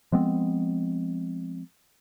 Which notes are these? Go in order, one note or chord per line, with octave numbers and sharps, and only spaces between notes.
F3 G#3 B3 C4